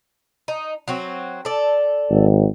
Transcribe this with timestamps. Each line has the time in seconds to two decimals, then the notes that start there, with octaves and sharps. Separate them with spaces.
0.48 D#4
0.88 F#3 C4 F#4
1.45 A4 D5
2.10 G#1